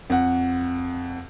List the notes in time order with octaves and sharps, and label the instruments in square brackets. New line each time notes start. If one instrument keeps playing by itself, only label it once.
[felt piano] F2 F#5